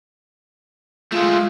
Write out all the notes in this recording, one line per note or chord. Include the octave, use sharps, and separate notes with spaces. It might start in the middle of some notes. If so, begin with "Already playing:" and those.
G#3 A3 F4